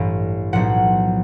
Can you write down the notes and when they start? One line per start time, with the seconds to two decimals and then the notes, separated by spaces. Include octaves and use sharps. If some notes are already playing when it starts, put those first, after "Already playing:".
Already playing: A1 G2 E3
0.53 B1 A2 F3 F#5